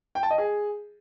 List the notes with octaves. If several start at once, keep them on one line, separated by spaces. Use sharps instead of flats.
G5
A5
D#5
G#4